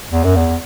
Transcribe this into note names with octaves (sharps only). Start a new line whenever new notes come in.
E2
F#2
E2